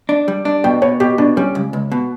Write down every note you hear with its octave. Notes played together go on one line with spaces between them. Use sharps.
D4
G3
D4
B2 G5
B2 C#5
B2 G4
B2 D4
G3 C#4
C#2
C#2
B2